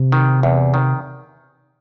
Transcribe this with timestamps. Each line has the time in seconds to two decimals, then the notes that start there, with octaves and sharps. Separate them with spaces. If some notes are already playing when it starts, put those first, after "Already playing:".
Already playing: C3
0.12 D#3
0.43 E2
0.74 D#3